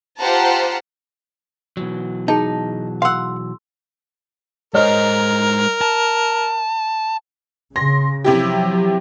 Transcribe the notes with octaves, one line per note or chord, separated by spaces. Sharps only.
F4 G4 C5 F#5 A5 A#5
B2 E3 F#3
D#4 G#4 A5
F5 F#5 C6 E6
G#3 A#4 C5 C#5 D#5 F6
A5
C#3 C6 A#6
C3 F3 F#3 E4 G4